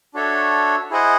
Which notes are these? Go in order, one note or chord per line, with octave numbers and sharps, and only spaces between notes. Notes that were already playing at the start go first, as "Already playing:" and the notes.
D4 F#4 A4 C#5 E5
E4 G#4 C5 D#5 F#5